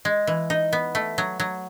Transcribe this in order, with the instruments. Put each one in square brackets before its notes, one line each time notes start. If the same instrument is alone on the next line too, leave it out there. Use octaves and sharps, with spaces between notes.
[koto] G#3
E3
D#4
B3
A3
F#3
F#3